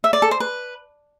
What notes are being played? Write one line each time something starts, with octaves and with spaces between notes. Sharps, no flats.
E5
D5
A4
C5
B4